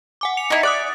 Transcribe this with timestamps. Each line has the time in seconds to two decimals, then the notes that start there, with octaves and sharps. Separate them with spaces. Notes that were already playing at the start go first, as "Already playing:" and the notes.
0.21 F#5 G#5 D6
0.37 C#7 F7
0.50 D#4 E4
0.63 D5 D#6 F#6 A6